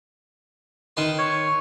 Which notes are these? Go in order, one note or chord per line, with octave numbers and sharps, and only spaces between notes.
D#3 B4 C6
C#5